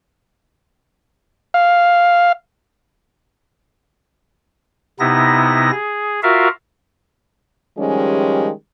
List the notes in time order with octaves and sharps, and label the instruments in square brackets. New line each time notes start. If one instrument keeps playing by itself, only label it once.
[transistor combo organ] F5
[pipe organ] C3 B3 D#4 E4 A#6
G#4
F4 F#4 A#4 E5 F5
[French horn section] D#3 F3 G3 G#3 C#4 G4